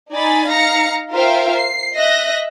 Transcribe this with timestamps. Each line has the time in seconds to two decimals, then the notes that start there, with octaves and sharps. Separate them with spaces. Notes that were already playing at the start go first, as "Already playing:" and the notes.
0.12 D#4 D5 G#5 B5 A6
0.49 D#4 F5 A#5 A#6 C#7
1.12 F4 A#4 C5 E5 F5 G5
1.56 C7
1.97 D#5 E5 F#6 A#6